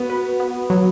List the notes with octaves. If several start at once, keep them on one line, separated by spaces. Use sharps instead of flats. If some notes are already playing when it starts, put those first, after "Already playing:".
Already playing: B3 F#4
B4
B3
F#3